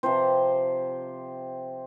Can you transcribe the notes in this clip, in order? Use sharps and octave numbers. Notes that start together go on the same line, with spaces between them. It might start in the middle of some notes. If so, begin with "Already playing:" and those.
C3 F3 C4 C5